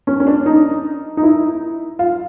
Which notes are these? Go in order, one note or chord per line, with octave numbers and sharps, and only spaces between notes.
C#4
C#4
D4
D#4
D#4
E4
F4